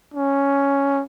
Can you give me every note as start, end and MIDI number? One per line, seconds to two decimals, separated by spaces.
0.14 1.03 61